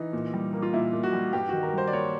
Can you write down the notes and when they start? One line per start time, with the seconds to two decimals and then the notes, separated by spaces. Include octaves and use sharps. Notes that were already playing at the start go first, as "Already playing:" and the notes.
Already playing: E3 D#4
0.13 A#2
0.34 G3
0.53 A#3
0.62 F4
0.73 A#2 E4
0.93 A#2
1.03 F#4
1.13 G3
1.33 G2 G4
1.49 D#3 F#4
1.63 A#4
1.73 G3 C5
1.88 D5
1.93 A#3 C#5